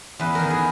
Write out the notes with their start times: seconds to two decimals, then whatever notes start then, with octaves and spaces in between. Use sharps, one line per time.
0.20 E2 B4
0.35 D#3 A#4
0.50 G#4